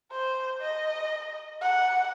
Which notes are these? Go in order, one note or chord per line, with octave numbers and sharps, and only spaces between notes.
C5
D#5
F#5